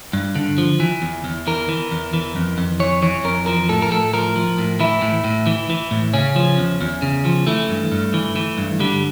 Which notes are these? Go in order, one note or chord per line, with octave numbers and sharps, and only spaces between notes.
G2
D3
F3
E3
E2
E2
E3 A#4
E3
E2
E3
F2
F2
E3 C#5
E3 C#5
F2 A#4
F3 A#4
A2 A4
A#4
A2 A4
F3 A#4
F3
A2
E3 E4
A2
A2
E3
E3
A2
C#3 C#4
F3
E2
E2
C#3
F3
E3 A3
G2
G2
E3
E3
G2
D3 G3